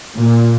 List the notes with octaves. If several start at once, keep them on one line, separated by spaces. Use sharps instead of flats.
A#2